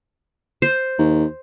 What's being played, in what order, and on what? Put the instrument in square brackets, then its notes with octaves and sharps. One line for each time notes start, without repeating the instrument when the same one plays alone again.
[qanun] C5
[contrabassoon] D#2